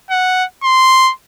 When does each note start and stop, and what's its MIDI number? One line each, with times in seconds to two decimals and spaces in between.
0.10 0.44 78
0.64 1.12 84